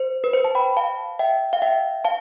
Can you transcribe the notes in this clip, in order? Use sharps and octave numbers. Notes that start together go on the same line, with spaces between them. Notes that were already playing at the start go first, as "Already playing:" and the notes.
Already playing: C5
B4
C5
A5
G5 B5
F5 A5
E5 G5
F5
E5 G5
F5 A5